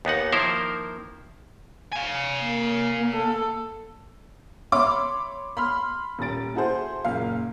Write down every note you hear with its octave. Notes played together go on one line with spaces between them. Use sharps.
D#2 B3 D#4 F#5
D#3 F3 A#3 E4 A#4 C5
F5 G#5
A#3
A4
C#5 E5 B5 C6 D6
B5 C6 F6
D#1 A#2 C#4 A6 D7
E4 F#4 G#4 A4 C5
F#1 A#2 F5